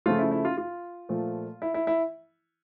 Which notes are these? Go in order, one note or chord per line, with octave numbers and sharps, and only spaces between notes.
C#3 F3 A3 F4
E4
E4
F4
F4
A#2 F3 A3
E4
E4
E4